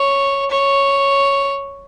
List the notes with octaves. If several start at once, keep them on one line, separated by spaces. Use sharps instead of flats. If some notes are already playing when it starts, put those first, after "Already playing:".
Already playing: C#5
C#5